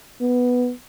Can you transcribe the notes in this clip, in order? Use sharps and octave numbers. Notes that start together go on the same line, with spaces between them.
B3